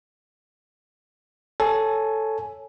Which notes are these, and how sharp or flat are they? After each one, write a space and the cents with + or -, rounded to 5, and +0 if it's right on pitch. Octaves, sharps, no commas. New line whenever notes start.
A4 +0 C#5 +0 G#5 +10